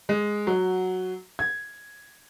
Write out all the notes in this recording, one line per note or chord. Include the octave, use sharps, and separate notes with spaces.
G#3
F#3
G#6